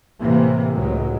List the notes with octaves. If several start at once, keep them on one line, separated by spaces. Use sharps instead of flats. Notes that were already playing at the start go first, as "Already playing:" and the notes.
A2 C3 E3 A#3
C#2 A2 F#3 G#3